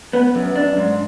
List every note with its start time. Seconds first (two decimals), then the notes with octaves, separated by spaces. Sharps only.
0.13 B3
0.35 F#2
0.55 D4
0.77 G#2